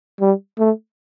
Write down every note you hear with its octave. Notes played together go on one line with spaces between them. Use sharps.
G3
A3